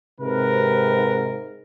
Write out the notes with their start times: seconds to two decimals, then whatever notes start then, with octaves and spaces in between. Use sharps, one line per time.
0.20 G#2 C3 A#4 B4